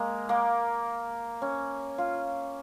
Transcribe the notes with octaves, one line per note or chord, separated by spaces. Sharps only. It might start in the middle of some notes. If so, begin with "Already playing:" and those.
Already playing: G#3 A#3
A#3
C#4
F4